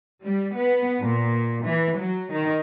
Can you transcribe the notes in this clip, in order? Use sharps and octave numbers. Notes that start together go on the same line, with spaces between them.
G3
B3
A#2
E3
F#3
D#3